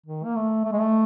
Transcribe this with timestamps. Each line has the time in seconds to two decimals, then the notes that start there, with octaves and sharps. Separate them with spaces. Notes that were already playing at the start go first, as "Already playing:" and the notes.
0.06 D#3
0.24 A#3
0.36 A3
0.65 A3
0.72 G#3
0.80 A3